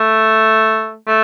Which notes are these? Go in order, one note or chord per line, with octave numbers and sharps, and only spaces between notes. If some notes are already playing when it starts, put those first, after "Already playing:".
Already playing: A3
A3